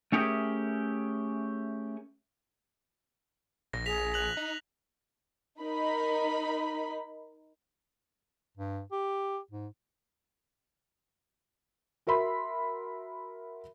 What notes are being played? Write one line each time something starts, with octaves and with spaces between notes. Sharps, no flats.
A3 C#4 G4 G#4 A#4 E5
A#1 A#6
G#4 B6 F7
F#6 F7 F#7
D#4
D#4 A#4 B5
G2
G4
G#2
F#4 A#4 E5 B5 C6